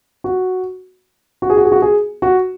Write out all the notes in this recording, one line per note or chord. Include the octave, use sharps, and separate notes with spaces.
F#4
F#4
G#4
F#4
G#4
F#4
G#4
F#4